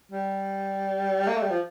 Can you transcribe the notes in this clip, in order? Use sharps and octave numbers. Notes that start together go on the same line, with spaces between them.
G3
A#3
A3
G3
F3